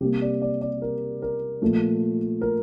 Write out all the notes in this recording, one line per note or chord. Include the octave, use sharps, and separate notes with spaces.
C3 G3 A#3 G4
D5
D5
D5
A#4
A#4
A#2 F3 A3
A#4